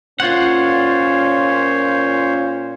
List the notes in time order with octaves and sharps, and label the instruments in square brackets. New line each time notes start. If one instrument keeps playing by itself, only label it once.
[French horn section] A#2 C#4 [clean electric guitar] F4 F#5 [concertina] C5 C#5